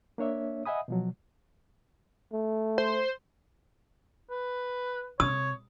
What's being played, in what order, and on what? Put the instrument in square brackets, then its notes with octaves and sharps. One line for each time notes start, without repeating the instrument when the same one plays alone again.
[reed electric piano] A#3 D4 C#5 E5
D#5 E5 F#5 G#5 B5 D#6
B2 F3 F#3
[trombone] A3
[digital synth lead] C5
[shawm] B4
[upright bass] C3 [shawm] C#5 [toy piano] D#6